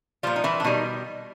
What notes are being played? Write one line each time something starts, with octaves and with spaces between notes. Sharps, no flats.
A#2 F3 G3 F4
D#4
E3 E4
D4
B2 D#3 G3 D#4